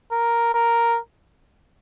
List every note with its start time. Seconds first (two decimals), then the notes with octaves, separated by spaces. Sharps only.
0.12 A#4
0.54 A#4